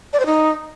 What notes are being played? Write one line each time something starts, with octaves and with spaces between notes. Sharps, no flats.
D5
C5
D#4